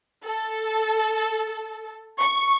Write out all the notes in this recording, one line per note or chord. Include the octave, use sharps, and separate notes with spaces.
A4
C#6